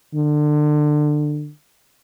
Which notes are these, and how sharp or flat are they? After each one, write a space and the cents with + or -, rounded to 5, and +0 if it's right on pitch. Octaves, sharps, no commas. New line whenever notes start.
D3 +25